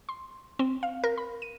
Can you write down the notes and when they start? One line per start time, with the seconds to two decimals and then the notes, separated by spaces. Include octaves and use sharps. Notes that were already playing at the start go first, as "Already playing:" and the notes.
0.09 C6
0.59 C4
0.83 F5
1.04 A#4
1.17 B5
1.42 D#7